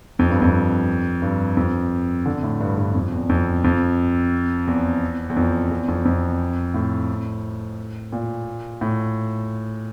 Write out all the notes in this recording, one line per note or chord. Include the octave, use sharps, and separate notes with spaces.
F2
G2
F2
G2
F2
D3
A2
G2
G2
F2
E2
F2
F2
E2
E2
F2
E2
F2
F2
A2
A#2
A2